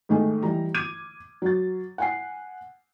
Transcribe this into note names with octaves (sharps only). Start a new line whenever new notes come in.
G#2 D#3 A3 G#4
E3 G3 A#5
D6 G#6 D#7
F#3 A6
F#5 G#5 C7